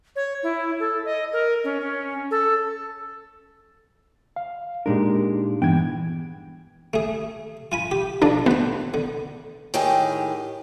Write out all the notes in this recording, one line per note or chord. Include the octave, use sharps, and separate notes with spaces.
C#5
E4
A4
D#5
A#4
C#4
C#4
A4
F5
A#2 G#3 D4 D#4 G4 A#4
G2 E3 B3 D4 G5 G#6
A3 G#4
F4 G#5 B5
G4
B2 D3 F3 D4
A1 B3 C5
D3
A2 D#3 G4 G#4